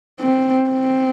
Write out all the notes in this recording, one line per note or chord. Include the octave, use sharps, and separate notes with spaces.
C4
C4